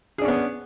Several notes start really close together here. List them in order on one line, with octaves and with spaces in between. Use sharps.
G#4 D4 C#4 B3